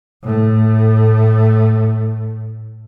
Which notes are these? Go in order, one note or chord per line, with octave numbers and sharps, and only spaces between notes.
A2 A3